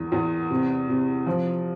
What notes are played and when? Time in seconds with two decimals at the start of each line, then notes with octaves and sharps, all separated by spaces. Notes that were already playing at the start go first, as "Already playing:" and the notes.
Already playing: E2 A#3
0.12 E2
0.50 C3
0.89 C3
1.27 F3